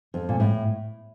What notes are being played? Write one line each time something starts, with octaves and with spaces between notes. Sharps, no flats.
F2
A#2
A2